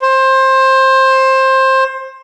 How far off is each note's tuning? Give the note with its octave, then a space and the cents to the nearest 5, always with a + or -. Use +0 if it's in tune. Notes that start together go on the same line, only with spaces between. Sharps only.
C5 +20